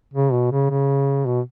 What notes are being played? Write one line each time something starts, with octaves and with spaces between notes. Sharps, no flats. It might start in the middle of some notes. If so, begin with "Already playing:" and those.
C#3
B2
C#3
C#3
B2